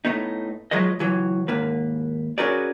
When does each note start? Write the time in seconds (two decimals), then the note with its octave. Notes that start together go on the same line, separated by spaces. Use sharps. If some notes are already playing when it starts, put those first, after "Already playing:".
0.05 A2 A3 B3 D#4
0.71 F3 F#3 G#3 B4 D#5
0.99 C#2 E3 F#3
1.48 D#2 G#2 A#3 B4
2.38 C#4 F#4 G#4 A#4 B4 D5